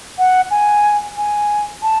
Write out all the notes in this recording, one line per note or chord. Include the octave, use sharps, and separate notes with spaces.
F#5
G#5
G#5
A5